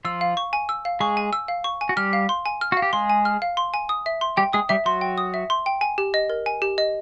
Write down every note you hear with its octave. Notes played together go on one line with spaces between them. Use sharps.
F3 F4 E6
F5
C#6
G#5
E6
F5
G#3 G#4 C#6
G#5
E6
F5
C#6
G#5
F#4
G3 G4 F6
F5
C6
G#5
F6
F#4
F5
G4
G#3 G#4 C6
G#5
F6
F5
C6
G#5
D#6
E5
C6
G3 G4 G5
G#3 G#4 D#6
G3 G4 E5
F#3 F#4 C6
G5
D#6
E5
C6
G5
G#5
G4
D#5
A#4
G#5
G4
D#5